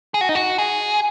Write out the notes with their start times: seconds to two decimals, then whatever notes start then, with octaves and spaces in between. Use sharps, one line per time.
0.14 G#4
0.21 F#4
0.29 D#4
0.35 F#4
0.58 G#4